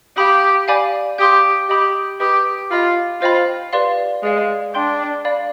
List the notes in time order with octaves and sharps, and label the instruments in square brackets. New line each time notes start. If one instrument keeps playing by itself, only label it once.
[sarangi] G4 [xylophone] F5 B5 D#6
[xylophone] D5 F5 G#5 B5 D6
[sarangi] G4 [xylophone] F5 C6 D#6 G6
[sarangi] G4 [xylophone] D#5 B5 D#6 G6
[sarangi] G4 [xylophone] B4 D#5 B5 D#6
[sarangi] F4 [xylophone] D#5 B5 F6
[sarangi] F4 [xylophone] C5 D#5 G5 B5
[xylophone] G4 B4 D5 F5 C6
[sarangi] G#3 [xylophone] G#4 D5 F5
[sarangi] D4 [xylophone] D5 G5 C6 G6
[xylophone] D5 F5 B5